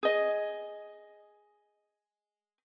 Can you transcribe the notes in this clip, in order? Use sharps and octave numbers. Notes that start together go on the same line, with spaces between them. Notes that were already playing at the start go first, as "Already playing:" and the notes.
G#4 D#5